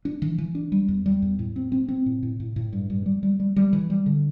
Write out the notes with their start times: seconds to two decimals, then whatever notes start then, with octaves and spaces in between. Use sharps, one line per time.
0.05 D4
0.22 E3
0.38 E3
0.55 D4
0.72 G3
0.88 E2
1.06 G3
1.22 E2
1.39 A2
1.56 C4
1.72 C4
1.88 C4
2.06 A2
2.23 A2
2.40 A2
2.56 A2
2.73 G2
2.90 G2
3.06 G3
3.23 G3
3.40 G3
3.56 G3
3.73 E3
3.90 G3
4.06 D3